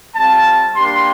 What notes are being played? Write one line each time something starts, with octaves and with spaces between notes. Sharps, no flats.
G3 C4 F4 A5
G3 A#3 D4 G4 C6